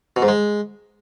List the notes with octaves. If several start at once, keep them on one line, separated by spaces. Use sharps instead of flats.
B2
G#2
G#3